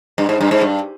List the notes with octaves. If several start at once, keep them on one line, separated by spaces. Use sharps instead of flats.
G2
G#2
G2
G#2
G2